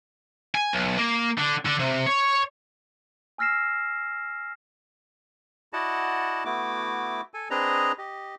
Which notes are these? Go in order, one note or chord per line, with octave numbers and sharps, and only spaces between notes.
G#5
B1
A#3
D3
D3
C3
C#5
G#5 E6 F6 A#6 C7 E7
E4 F#4 D5 D#5 F#5 A5
A3 B3 E4 F#4 D6
A4 G#5
C4 D4 G#4 B4 D#5 A#5
G4 D#5